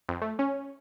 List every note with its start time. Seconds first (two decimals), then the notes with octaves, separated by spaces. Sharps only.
0.09 F2
0.22 A3
0.39 C#4